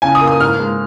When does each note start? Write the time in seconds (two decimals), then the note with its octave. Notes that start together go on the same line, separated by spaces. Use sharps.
0.02 C#3 G#5
0.15 D#6
0.21 A#3
0.28 D#6
0.40 G#2 F6
0.59 G#3